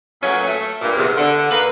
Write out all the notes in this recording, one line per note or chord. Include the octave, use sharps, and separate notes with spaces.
A#2 F#3 A3 B3 C#4
A3
G2 A#2
E2 C3
D3
D#2 A#3 B4